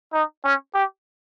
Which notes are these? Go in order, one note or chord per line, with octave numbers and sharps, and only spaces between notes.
D#4
C#4
G4